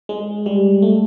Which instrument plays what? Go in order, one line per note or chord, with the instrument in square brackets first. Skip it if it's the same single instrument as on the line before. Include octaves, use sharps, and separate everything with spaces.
[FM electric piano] G#3
G3
A3